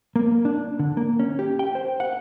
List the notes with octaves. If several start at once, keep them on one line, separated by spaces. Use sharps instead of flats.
A#3
D4
D3
A#3
C#4
G4
G5
C5
F#5